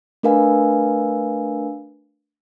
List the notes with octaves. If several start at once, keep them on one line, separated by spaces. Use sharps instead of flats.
A3 D4 A#4 B4 F5 G#5